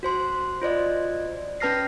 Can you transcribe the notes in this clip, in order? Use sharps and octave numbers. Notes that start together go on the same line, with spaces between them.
F#4 C5 C6
F4 C5 D5 D#5
C#4 B4 A5 F6 A#6 C7